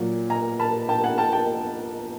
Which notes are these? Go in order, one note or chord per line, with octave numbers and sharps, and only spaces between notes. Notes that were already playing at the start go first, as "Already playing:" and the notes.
Already playing: A#2 F#3
G#5 A#5
A5 B5
G5 A5
F#5 G#5
G5 A5
G5 A5